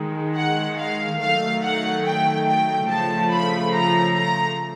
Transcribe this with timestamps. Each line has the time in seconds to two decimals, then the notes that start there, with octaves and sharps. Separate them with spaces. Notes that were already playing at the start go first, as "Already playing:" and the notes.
Already playing: D#3 G#3
0.35 F#5
0.78 F5
1.20 D#3 F#3 A3 F5
1.62 F#5
2.04 G5
2.46 G5
2.89 C#3 F3 A3 A5
3.31 B5
3.73 A#5
4.15 A#5